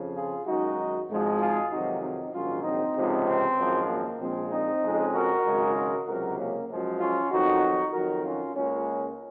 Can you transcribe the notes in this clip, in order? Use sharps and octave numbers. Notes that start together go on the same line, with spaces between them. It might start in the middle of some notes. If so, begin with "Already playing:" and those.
Already playing: F2 C#3 F3
F4 G#4
F#2 D#3 G#3 D#4 F#4
G#1 G#2 F3 G#3
F4 G#4
F2 C3 D#3 F#3 D#4 F#4
C4 D#4
A#1 G#2 D#3 F#3 C#4 F4
C4 D#4
C#2 C3 F3 G#3
C4
G#1 F#2 F3 G#3
A#3
A#1 A#2 F3 G#3 C4
C4 D#4
F2 C#3 G#3
F#4 A#4
G#1 F#2 C#3 G#3
F#4 A#4
C#2 C3 F#3 F#4 A#4
A#3 C#4
F#2 F3 G#3
C#4 F4
F2 D#3 F#3 D#4 F#4
F2 D#3 F#3 F#4 A#4
C#4 F4
C#2 C#3 G#3 A#3 C#4